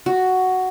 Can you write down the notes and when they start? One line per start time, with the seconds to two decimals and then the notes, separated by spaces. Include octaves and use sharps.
0.06 F#4